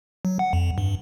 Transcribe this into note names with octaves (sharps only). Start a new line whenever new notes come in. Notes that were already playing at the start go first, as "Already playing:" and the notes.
F#3
F#5
F2
G2